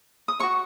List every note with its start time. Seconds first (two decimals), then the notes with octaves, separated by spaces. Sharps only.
0.28 D#6
0.40 F#4 C#5 C#6